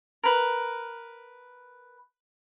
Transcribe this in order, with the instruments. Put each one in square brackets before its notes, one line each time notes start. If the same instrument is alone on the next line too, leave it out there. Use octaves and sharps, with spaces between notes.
[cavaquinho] A#4 B4